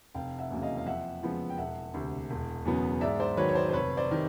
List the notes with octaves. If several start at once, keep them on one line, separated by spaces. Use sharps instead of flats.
F1 F5 G5
E5 F#5
E2 C#3 F#3 A#3
D#5 F5
F5
F2 E5 F#5
C#3 F3 G#3 B3
G5
E1 E5 F#5
D2 C3
E1
E2 C#3 F#3 B3
G#2 D5 E5
C5 D5
D#3 F#3 B4 C#5
C#5
C5 D5
C5
F1 B4 C#5
C5 D5
C3 D#3